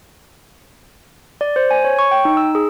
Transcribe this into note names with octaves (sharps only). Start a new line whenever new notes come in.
D5
C5
G#5
C#5
C#6
G5
D#4
E6
G#4